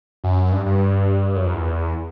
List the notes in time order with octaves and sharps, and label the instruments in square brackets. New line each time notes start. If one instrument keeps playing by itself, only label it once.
[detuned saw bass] F#2
G2
G2
F#2
F2
E2